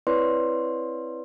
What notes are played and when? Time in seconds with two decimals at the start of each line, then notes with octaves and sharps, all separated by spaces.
0.07 C4 E4 B4 C#5 D5 C6